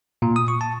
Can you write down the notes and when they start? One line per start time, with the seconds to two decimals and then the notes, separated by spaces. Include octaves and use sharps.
0.22 A#2
0.36 D#6
0.48 C#6
0.61 A5